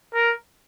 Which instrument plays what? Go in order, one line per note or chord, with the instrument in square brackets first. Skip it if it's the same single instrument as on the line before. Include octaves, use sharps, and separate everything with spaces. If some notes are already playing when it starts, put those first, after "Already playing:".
[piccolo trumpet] A#4